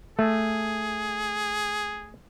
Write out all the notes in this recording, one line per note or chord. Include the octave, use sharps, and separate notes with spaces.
A3 G#4